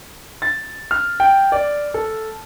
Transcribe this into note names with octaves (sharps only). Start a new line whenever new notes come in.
A6
F6
G5
D5
A4